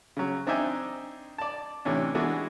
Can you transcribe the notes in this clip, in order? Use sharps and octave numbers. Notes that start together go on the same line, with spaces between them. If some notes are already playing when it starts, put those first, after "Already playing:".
C#3 F#3
C4 D4 D#4 E5 G5 G#5
D5 A5
A2 C3 E3 C#4 D4
E3 G#3 B3 D4 F#4